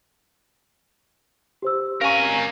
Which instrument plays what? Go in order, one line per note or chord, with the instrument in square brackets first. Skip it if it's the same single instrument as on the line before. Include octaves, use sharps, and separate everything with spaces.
[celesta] G4 C5 E6
[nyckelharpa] C#4 A#5 [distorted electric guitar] A#4 G#5 [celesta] F5 C#6